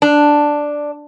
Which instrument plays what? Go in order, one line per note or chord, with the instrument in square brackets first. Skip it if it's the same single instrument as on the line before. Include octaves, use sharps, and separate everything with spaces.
[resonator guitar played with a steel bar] D4